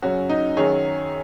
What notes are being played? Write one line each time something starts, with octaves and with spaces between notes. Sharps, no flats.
F#2 C#3 F#3 C#4 F#4
D#4
F#2 D#3 F#3 G#4 C#5